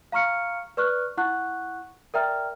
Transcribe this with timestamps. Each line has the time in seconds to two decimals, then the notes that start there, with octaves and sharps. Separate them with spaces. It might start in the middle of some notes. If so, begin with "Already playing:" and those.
0.12 F5 A#5 C#6 F6 C#7
0.77 B4 D5 C#6 F6 F#6
1.18 E4 F#5 C#6 F#6
2.14 A#4 D5 E5 G5 A#5 F6